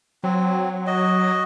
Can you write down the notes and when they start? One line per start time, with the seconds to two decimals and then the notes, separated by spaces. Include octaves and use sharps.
0.24 F#3 C4
0.87 F#4 D#5